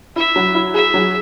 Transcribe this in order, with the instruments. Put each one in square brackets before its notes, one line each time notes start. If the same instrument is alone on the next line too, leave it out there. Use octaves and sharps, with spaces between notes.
[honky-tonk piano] E4 [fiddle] E5
[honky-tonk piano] F#3
E4
[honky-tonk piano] G#4 [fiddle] E5
[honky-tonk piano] F#3